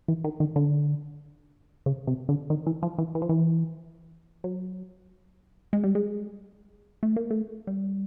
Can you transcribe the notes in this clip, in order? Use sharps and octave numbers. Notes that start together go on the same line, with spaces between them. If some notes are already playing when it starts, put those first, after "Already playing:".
E3
D#3
D#3
D3
C#3
C3
D3
D#3
E3
F3
E3
E3
F3
E3
F#3
G#3
G3
G#3
A3
A#3
A3
G3